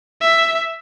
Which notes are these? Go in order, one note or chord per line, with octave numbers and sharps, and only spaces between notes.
E5